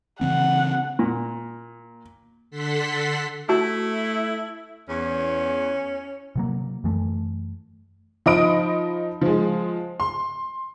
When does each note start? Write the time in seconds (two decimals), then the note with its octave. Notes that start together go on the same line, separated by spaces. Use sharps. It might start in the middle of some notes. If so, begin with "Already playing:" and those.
0.21 C#3 E3 C4 F#5
0.99 A#2
2.51 D3 A4 F#5 C6 B6
3.49 A3 E4 F#4 A5 E6
4.89 E2 C#4
6.36 C3 F#3 A#3
6.84 F#2 E3 A3
8.26 F3 D#4 D#5 B5 D#6 D7
9.21 F3 G#3
10.00 C6